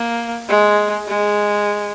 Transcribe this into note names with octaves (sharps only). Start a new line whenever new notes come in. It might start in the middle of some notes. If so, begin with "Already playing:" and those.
Already playing: A#3
G#3
G#3